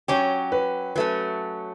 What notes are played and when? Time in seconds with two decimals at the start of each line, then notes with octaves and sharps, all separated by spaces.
0.08 F#3 C#4 G4 C#5
0.52 B4
0.96 F#3 A3 C#4 B4